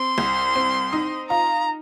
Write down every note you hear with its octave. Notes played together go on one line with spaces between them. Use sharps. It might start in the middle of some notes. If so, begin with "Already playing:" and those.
Already playing: C4 C6
C2
C4
D#4
F4 A#5